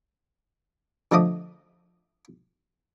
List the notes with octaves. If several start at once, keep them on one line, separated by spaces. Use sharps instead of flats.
D3 F3 A3 D#5 D6 D#6